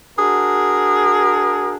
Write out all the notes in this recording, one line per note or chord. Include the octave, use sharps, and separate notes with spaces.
D4 F#4 G#4 A#4